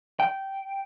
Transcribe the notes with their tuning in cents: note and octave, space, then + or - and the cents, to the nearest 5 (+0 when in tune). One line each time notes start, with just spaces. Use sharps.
G5 -15